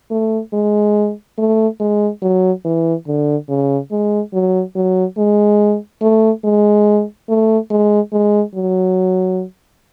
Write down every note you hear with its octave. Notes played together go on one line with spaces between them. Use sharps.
A3
G#3
A3
G#3
F#3
E3
D3
C#3
G#3
F#3
F#3
G#3
A3
G#3
A3
G#3
G#3
F#3